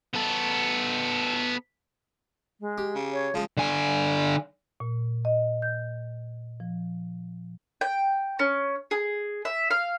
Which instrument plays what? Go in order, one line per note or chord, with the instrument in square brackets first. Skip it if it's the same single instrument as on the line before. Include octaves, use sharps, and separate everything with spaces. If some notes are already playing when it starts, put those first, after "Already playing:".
[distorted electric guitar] B3 A4
[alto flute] G#3
[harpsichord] G4
[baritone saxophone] C#3
[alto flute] C#5
[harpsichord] C#2 G#3 [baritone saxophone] F3
[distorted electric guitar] D3 G#5
[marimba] A#2
D#5
G6
F3
[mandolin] G5
C#4
G#4
E5
F5